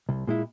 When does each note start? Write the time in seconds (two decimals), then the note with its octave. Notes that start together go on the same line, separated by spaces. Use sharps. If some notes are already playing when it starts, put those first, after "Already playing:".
0.09 C2
0.27 A#2 G#3 E4